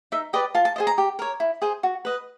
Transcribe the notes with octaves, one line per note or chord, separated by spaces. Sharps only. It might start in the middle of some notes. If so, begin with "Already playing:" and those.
D#4 E5
G4 B4 D5 D#5
F4 A5
A5
G#4 C5 D#5
A#5
G4
A#4 C#5
E4
G#4 C5
F#4
B4 D#5